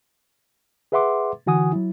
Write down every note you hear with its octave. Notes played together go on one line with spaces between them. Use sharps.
G#4 B4 E5 F#5 C6 D6
D3 E3 F#4 F#5 G#5 D#6
F#3 E4